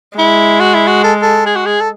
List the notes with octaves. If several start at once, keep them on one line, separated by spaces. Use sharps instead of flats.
G#3 E4
F#4
E4
F#4
A4
A4
G#4
F#4
G#4
A4